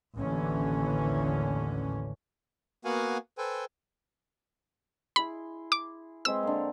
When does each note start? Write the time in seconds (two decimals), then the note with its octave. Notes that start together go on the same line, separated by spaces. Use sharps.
0.17 A1 D#2 D3 E3 C#4
2.85 A#3 B3 F#4 F5 F#5 G#5
3.38 A4 B4 C5 G5 G#5
5.16 E4 G#4 B5 C6
5.72 D6
6.25 G#3 C4 B4 E6
6.43 D3 A#3